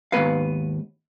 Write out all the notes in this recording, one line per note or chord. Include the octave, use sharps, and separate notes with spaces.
D#2 G#2 B3 B4 F5